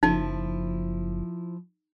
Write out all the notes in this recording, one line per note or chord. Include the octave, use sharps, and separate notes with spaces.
F#1 F3 D#4 E4